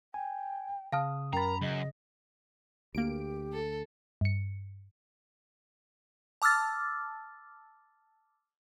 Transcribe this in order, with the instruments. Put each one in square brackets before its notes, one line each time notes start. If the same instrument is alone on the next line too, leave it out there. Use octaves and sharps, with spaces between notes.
[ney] G5 [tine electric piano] G#5
[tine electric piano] C#3 D#6 [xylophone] F5 A5 F6
[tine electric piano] F#2 B5 [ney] A#4 [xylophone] G5 A6 [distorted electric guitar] A#5
[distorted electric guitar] F#2 [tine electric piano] C#3 [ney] D#5
[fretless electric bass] D2 [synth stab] A#3 D7 [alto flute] G4
[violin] A4
[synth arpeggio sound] G2 C#7
[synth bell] A5 D6 E6 F6 A6